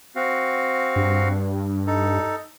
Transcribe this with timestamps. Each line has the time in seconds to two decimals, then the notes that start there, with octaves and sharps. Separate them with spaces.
0.16 C4 F#4 F5
0.96 G2
1.87 D#4 A4